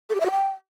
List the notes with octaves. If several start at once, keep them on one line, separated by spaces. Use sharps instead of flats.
A4
G4
E5
F#4
G5